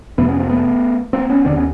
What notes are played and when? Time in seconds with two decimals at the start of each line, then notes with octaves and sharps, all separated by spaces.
0.18 F2 C3 A3 B3
0.28 B3 C#4
0.39 A#3 C4
0.50 A3 B3
1.13 A#3 C4
1.29 B3 C#4
1.45 D#2 D3 C4 D4
1.56 B3 C#4